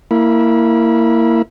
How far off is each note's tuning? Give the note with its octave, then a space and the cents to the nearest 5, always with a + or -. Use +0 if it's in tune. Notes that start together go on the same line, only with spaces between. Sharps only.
A#3 -15 E4 +0 B5 -30